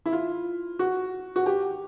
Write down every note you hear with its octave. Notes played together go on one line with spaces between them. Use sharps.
E4
F4
F#4
F#4
G4